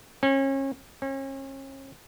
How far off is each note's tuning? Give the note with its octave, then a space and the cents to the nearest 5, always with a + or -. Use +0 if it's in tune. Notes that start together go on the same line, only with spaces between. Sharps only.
C#4 -35
C#4 -40